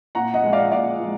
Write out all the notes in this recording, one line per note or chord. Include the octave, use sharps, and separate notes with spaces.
A#2 F#5 A#5
D#5 F#5
F3 G#3
D5 F5
A#2 D5 F5
F3 G#3